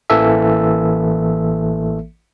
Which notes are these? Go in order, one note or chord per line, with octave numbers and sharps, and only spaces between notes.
A1 E3 A#3 A4 E5